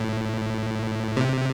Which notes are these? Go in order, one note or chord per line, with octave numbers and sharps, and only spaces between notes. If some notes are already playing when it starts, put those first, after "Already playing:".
Already playing: A2
C3